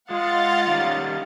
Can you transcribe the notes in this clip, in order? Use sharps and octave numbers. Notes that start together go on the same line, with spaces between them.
G#3 F4 F5 F#5 A6
D#3 G3 C#4